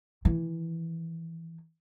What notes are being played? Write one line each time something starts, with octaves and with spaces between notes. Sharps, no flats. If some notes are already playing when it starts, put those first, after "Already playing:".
D#3 E3